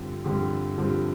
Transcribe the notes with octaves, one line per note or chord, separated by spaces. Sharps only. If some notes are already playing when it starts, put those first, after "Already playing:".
Already playing: G2 D3 F3 C4 G4
G2 D3 F3 C4 G4
G2 D3 F3 C4 G4